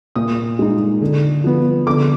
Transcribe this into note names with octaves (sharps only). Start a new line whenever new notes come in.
A#2 D#6
G#3 D#4
D3
F3 B3
D3 D6